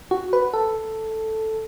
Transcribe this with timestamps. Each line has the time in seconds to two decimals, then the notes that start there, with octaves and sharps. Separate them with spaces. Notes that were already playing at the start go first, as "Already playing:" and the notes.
0.11 F#4
0.33 B4
0.54 A4